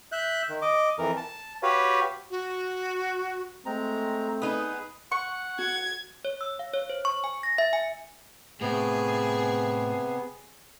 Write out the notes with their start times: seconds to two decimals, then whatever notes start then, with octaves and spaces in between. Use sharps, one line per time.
0.12 E5 F#6 G6
0.49 D#3
0.62 D#5 D6
0.98 F2 E3 A#4
1.17 A5
1.63 F#4 G4 B4 C#5 F5
2.30 F#4
3.66 G#3 A3 C4 A#5
4.42 B3 D#4 G#4 B4 D#6
5.11 F#5 C#6
5.59 F#4 G#6
6.25 C#5
6.41 E6
6.59 F5
6.74 C#5
6.90 C5
7.05 C#6
7.24 G#5
7.43 A#6
7.58 E5
7.73 G#5
8.61 A2 C3 B3 G#4